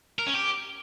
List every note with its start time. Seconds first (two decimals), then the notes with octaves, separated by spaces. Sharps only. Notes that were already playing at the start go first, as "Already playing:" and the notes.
0.19 A#4
0.27 C#4
0.34 G4